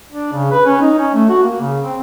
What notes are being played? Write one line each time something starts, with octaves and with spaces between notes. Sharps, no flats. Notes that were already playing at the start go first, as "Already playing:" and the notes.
D4
C#3
B4
C#4
D#4
C#4
A3
F#4
A#3
C#3
C4